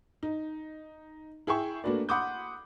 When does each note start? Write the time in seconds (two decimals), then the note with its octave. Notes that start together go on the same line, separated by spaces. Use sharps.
0.23 D#4
1.47 E4 G#4 E5 G5 G#5 C#6
1.84 A3 A#3 D4 F#4 B4 D5
2.09 F#5 B5 C6 D6 D#6 G6